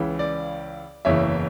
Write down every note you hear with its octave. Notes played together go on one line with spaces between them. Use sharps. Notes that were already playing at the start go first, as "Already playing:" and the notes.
Already playing: C#2 C#3 E3
D5
F#1 E2 C#3 E3 C#5 E5